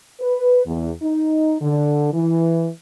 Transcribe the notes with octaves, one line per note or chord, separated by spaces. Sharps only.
B4
E2
D#4
D3
E3